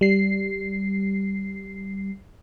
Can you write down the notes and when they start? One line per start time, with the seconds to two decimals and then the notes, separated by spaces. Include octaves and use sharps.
0.01 G3 C7